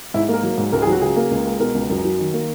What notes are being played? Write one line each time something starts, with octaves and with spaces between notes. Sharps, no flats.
G#2 E4
A#3 A#4
F#3
G#2
C#2 A#4
G#4
F#3
F#4
C#3 G#4
A#3
C#2
G#3
B2 A#4
C#2
F#2 A#4
F#3
D#3
A#3